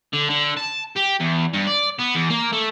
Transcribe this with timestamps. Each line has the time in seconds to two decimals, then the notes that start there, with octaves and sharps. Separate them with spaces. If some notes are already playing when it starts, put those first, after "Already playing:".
0.13 D3
0.30 D3
0.57 A5
0.97 G4
1.20 E2
1.53 G2
1.67 D5
1.99 B3
2.14 E2
2.30 A#3
2.53 A3